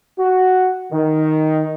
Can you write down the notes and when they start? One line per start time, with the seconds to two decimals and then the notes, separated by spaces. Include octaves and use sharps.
0.19 F#4
0.93 D#3